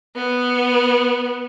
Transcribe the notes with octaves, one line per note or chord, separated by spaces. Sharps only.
B3